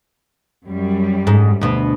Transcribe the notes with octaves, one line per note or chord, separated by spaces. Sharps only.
F#2 G3
G#2
D2 B2